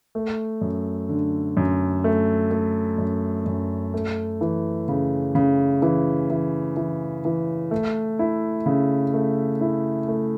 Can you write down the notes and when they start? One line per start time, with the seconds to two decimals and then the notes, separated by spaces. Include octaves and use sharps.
0.15 A3
0.61 F#2
1.09 D3
1.57 F#2
2.04 A3
2.51 A3
2.98 F#2
3.46 F#2
3.94 A3
4.41 E3
4.88 C#3
5.35 C#3
5.82 E3
6.30 E3
6.76 E3
7.25 E3
7.71 A3
8.19 E4
8.66 C#3
9.14 A3
9.61 E4
10.08 A3